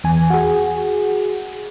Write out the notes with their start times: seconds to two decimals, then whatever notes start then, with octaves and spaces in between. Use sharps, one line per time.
0.04 E2 G#5
0.30 F#4 G#4